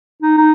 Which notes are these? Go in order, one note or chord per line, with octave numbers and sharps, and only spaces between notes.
D#4
D#4